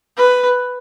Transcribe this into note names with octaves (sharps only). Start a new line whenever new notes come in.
B4